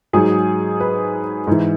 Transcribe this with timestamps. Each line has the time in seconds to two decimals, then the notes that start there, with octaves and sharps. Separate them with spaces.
0.13 G#2 F#3 G#4
0.80 B4
1.47 G#2 E3